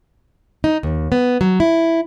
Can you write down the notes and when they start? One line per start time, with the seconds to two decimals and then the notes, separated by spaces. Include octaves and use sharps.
0.64 D#4
0.83 D#2
1.12 B3
1.41 F#3
1.60 E4